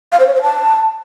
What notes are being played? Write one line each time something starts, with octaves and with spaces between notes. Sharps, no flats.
F5
C5
C#5
C5
A5